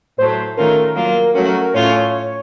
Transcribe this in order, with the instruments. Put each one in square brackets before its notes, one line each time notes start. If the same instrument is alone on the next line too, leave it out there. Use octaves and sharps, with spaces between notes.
[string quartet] A2 F#3 A3 [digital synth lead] C5
[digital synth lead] C5
[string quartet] D#3 A3 C#4 F4 [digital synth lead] A#4
[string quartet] F#3 A#3 F4
[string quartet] F#3 A3 C#4 F#4 [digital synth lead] A#4
[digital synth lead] A#4
A#4
[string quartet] A2 A3 C#4 F4 [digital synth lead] C#5